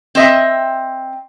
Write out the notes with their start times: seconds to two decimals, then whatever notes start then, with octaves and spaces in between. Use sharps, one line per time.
0.15 C4 D#5 E5